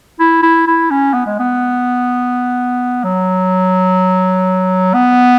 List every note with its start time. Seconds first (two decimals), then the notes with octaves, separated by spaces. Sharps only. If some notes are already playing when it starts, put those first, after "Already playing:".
0.20 E4
0.43 E4
0.67 E4
0.91 C#4
1.14 B3
1.26 G#3
1.39 B3
3.04 F#3
4.94 B3